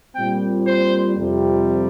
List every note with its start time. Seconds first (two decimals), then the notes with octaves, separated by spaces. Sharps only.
0.15 A#2 G3 C4 G5
0.66 C5
1.16 F2 C3 G3